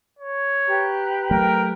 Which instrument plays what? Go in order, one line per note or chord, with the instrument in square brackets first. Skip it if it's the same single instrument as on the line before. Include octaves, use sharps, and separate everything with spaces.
[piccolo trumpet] C#5
[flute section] G4 B4 A#5
[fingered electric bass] F#3 A3 [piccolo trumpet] A#4 [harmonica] G5